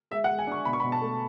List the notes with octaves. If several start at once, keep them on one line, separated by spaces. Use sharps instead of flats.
G#3 E5
F#5
G#3
G#5
D4 C#6
B2 B5
C#6
B5
B2
A5
A3